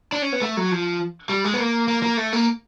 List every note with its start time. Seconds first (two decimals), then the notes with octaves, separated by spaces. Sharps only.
0.12 D4
0.22 C#4
0.32 B3
0.42 A3
0.57 F#3
0.72 F3
1.29 G3
1.44 G#3
1.54 B3
1.60 A#3
1.88 A#3
2.03 A#3
2.17 A3
2.33 A#3